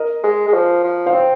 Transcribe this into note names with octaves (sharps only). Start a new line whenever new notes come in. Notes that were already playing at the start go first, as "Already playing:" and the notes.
Already playing: A#4 D#5
G#3
G#3
F3
F3
C5 F5
C4